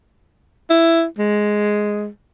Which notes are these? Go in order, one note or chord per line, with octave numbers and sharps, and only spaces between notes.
E4
G#3